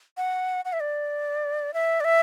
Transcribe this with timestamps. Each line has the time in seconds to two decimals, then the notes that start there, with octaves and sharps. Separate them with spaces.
0.17 F#5
0.65 F#5
0.73 E5
0.80 D5
1.74 E5
2.00 D5
2.04 E5